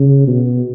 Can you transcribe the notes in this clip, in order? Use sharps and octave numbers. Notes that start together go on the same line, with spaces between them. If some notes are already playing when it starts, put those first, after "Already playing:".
Already playing: C#3
B2